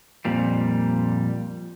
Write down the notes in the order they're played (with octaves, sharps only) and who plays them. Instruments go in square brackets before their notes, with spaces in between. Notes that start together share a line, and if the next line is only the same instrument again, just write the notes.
[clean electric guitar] F2 A#2 G3